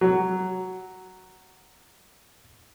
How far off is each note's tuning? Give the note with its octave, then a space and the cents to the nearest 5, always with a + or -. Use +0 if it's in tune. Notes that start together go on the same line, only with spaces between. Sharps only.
F#3 +10